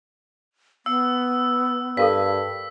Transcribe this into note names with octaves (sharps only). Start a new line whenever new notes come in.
B3 F#5 E6
G2 A4 A#4 F5 B6